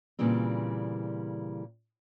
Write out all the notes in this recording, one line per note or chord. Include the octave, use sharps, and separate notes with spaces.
A#2 C#3 E3 G3 C4